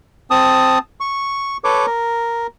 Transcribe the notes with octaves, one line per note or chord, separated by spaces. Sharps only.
C4 A5 D#6
C#6
A4 B4 C#5 D6
A#4